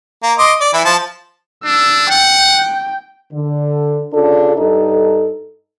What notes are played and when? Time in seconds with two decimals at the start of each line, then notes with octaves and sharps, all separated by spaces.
0.23 A#3
0.38 D#5 C6 D6
0.61 D5
0.73 E3 E4
0.85 F3 A5
1.65 D4 E6
2.10 F#5 G5
3.33 D3
4.14 C#3 D4 F4 A4
4.57 G2 D#4 A4